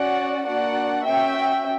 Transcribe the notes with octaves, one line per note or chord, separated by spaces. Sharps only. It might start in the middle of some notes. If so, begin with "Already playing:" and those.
Already playing: C#4 F#4 D5 F#5
A#3 D4 F#4 D5 F#5
C#4 F#4 E5 G5